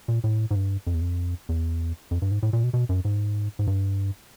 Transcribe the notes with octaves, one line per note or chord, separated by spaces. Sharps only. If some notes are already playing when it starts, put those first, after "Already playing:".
A#2
A2
G#2
G2
F2
E2
F2
E2
F2
G2
G#2
A2
A#2
B2
B2
F#2
G#2
G#2
G2